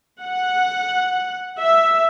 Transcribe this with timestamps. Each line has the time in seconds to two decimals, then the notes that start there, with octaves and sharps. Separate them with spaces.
0.22 F#5
1.59 E5